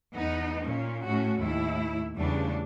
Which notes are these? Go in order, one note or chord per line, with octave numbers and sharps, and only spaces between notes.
E2 B3 D#4
A#2 C#4
A2 C#4 F#4
D#2 A2 E4
E2 C#3 G3 A3 D4